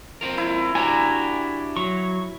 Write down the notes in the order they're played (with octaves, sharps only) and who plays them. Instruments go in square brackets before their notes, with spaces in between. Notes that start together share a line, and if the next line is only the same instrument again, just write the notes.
[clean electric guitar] C4 F4 A#4
[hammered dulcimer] E4
[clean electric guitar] D4 F#4 G4 [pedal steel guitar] G#5 A#5
[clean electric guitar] F#3 [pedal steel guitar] C#6